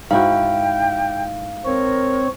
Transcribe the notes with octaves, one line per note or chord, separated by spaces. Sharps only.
G#2 E4 F#4 F5 G5
C4 A#4 C#5